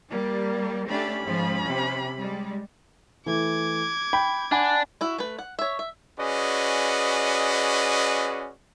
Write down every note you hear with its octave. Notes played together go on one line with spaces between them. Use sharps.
G3 A#3
A3 C#4 D4 G4 B5
G#2 F3
C3
G3 G#3
E3 A3 D6 G#6
G5 B5
D4 F#5 G#5 B5
E4 F#4
A3 B4
F#5
C#5 E5
E5
C#4 F#4 G#4 B4 D5 D#5